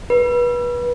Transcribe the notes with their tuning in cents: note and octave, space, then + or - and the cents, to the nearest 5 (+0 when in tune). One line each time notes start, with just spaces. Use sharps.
B4 -25